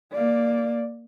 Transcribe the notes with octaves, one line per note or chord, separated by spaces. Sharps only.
A#3 D5